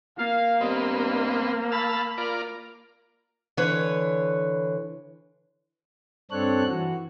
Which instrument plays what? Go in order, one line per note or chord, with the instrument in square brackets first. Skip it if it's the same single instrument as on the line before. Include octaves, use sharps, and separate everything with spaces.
[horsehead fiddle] A#3 [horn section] F5
[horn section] G2 D#5 [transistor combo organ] B3 C4
[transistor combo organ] F5 A5 E6 [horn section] B5
[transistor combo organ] F4 A#4 D5
[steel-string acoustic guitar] D3 E3 B4 C#5
[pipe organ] G2 C4 D4 A4 C#5 F#6
E3 F#4